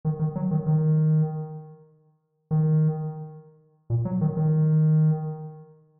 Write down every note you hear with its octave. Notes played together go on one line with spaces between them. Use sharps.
D#3
D#3
F#3
D#3
D#3
D#3
A#2
F#3
D#3
D#3